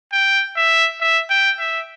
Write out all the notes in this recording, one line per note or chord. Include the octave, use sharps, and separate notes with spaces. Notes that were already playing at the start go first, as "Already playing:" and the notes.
G5
E5
E5
G5
E5